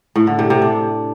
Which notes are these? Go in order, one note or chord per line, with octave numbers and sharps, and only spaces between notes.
A2
D3
C3
C3
D4